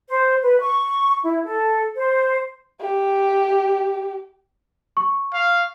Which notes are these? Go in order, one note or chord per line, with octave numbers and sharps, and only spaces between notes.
C5
B4
C#6
E4
A4
C5
G4
C#6
F5